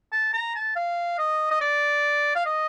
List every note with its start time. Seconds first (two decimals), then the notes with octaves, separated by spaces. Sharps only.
0.12 A5
0.33 A#5
0.56 A5
0.76 F5
1.18 D#5
1.51 D#5
1.61 D5
2.35 F5
2.46 D#5